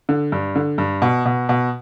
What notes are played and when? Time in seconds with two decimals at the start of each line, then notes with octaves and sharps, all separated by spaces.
0.09 D3
0.32 G2
0.56 D3
0.78 G2
1.02 B2
1.26 B2
1.49 B2